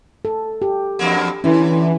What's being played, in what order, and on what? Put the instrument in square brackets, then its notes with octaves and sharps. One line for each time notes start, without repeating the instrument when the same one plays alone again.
[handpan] A4
G4
[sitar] E2 G2 A#3
[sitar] D3 [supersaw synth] E3 [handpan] C#4